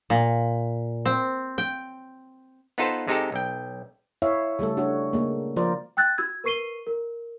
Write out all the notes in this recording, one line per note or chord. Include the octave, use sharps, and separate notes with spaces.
A#2
C4
G5
B3 D#4 F4 A4 B4 C5
C3 G#3 D#4 G4 A4
B1 G5
E4 C#5 E5 F5
C#3 G3 A3 A4
D4 F#4 C#5
C#3 G#3 A#3
F3 F4 A#4 C5 D5
G5 E6 F#6 A6
F#4 E6 G#6
A#4 B4 C#6 C7 D#7 G7
A#4